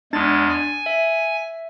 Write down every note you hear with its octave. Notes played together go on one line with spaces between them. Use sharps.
E2 G#3 D4 A6
G#5
E5